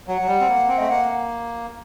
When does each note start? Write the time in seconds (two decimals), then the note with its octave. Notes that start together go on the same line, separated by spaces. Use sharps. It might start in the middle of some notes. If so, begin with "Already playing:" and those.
0.07 F#3 F#5
0.21 F#3
0.27 G3
0.41 C4
0.48 A#3
0.68 C4
0.78 A3 D#5
0.89 A#3 F#5